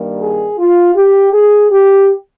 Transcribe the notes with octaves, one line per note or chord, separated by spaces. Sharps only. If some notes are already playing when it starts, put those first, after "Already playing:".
Already playing: G2 D#3 G3 A#3
G#4
F4
G4
G#4
G4